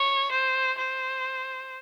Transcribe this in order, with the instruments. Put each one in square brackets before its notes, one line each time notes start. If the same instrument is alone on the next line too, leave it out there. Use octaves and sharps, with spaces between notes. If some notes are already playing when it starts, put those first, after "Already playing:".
Already playing: [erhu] C#5
C5
C5